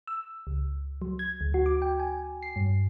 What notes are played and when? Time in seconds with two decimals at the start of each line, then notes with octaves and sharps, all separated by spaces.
0.07 E6
0.47 C#2
1.02 F#3
1.19 G#6
1.41 D2
1.54 F#4
1.66 D6
1.82 G5
2.00 G#5
2.43 C7
2.56 G2